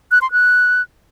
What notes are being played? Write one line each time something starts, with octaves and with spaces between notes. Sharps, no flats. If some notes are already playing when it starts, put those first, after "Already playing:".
F#6
C6
F#6